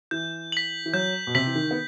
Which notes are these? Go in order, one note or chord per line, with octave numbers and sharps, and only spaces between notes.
E3 G6
B6 F#7
E3
F#3 G6
B2
C3 B6 F#7
E3
D#3
B3